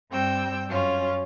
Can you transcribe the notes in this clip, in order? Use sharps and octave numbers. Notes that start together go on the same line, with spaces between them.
G2 G3 C4 G5 E6
F#2 C#4 F4